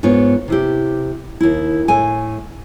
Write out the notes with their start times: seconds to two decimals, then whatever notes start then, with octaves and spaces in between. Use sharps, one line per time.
0.03 G#2 B3 F4 C#5
0.48 C3 E4 G4
1.41 D#2 E4
1.88 A2 A4 G#5